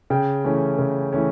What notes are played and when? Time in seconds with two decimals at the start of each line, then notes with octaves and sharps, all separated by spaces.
0.10 C#3 G5
0.44 E3 A3 C#4
0.78 C#3
1.13 E3 A3 C#4